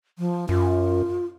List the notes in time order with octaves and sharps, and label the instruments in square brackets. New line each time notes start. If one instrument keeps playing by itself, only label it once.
[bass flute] F3
[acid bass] F#2 [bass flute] F4